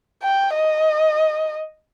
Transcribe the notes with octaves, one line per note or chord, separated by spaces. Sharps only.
G5
D#5